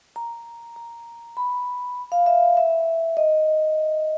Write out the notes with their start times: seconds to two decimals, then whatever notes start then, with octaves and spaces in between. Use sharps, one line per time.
0.16 A#5
0.76 A#5
1.37 B5
2.12 F5
2.26 E5
2.57 E5
3.17 D#5